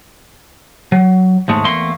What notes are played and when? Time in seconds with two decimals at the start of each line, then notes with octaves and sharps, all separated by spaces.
0.92 F#3
1.48 D#2 G#2 G#3 A3
1.64 E2 A3 A#3 C6